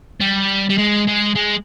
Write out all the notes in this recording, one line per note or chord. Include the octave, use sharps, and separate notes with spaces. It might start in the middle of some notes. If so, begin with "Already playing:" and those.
G3
G3
G#3
G#3
G#3